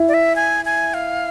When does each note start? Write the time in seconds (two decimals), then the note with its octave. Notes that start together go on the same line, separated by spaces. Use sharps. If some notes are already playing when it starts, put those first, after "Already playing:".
Already playing: E4
0.08 D5
0.14 E5
0.36 G#5
0.65 G#5
0.94 F5